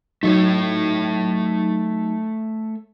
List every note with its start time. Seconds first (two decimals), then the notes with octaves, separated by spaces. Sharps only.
0.23 F#3 A3 D#4 A4 C#5